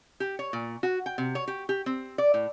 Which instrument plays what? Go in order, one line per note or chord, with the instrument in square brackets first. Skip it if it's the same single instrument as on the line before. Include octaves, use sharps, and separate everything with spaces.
[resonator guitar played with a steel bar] G4
C#5
A#2
F#4
G5
C3
C#5
G4
G4
C4
D5
A2